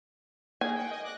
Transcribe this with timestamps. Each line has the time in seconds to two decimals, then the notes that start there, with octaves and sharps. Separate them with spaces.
0.61 A#3 G#4 G#5
0.75 F#5 G5
0.91 D#5
1.03 D6 F#6 A#6